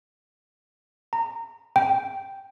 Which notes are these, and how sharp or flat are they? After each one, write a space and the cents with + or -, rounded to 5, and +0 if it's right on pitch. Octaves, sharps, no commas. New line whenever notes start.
A#5 -20
G5 +0